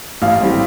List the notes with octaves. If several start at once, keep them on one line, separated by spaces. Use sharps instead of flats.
A1 F5
A2 G3 C4